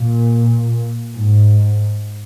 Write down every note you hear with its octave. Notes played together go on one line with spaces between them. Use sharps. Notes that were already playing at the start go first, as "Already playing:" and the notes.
Already playing: A#2
G#2